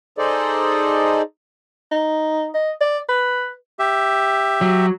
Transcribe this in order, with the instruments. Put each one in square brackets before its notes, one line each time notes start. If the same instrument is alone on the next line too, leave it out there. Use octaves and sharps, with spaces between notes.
[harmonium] D#4 G#4 A4 C5 D5 D#5
[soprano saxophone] D#4
D#5
D5
B4
[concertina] G4 E5
[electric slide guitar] F#3